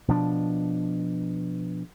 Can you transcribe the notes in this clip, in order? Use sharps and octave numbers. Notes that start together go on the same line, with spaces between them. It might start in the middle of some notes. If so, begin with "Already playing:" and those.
B2 F3 D4